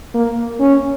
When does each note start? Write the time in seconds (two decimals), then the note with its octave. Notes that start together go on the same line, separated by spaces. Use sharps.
0.14 A#3
0.60 C#4